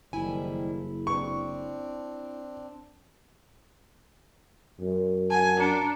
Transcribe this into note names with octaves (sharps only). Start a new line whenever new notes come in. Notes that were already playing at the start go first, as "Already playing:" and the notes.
F#1 D#3 F3 G3 E4 G#5
C4 D4 C#6
F#2
F#5 G#5 A5
D4 A#5 C#7